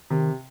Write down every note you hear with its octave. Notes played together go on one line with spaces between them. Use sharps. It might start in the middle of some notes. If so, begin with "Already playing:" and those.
C3 D#3